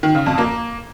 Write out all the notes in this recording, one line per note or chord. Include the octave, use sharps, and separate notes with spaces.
D#3
C#3
F2
A#3